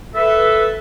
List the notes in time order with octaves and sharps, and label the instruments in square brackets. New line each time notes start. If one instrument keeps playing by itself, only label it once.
[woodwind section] A4 B4 E5